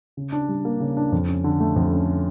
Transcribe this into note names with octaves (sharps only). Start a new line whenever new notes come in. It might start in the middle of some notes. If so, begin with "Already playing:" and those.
C#3
D4
G3
A#3
C#3
D4
F2
C#4
D3
A3
F2
C#4